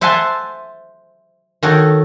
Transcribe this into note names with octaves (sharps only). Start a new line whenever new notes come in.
C5 E5 F#5 G#5 A5 C6
D#3 F#4 A4 C#5